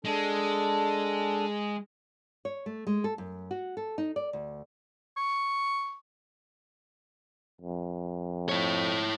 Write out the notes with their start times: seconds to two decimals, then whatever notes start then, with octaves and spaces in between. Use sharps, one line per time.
0.05 G#3 D4 A4
2.45 C#5
2.66 A3
2.87 G#3
3.04 A4
3.18 F#2
3.51 F#4
3.77 A4
3.98 D#4
4.16 D5
4.33 D2
5.17 C#6
7.61 F2
8.49 E4 C#5